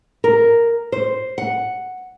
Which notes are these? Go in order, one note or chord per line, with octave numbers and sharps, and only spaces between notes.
A#4
C5
F#5